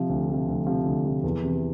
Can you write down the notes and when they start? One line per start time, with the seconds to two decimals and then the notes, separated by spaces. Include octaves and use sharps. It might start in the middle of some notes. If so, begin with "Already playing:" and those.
Already playing: C3 F3
0.09 D2
0.29 C3 F3
0.48 D2
0.67 C3 F3
0.86 D2
1.05 C3 F3
1.24 E2
1.43 C3 E3